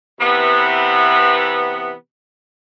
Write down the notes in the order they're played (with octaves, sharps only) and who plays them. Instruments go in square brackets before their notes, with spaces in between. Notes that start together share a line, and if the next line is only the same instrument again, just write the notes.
[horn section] C3 E3 B3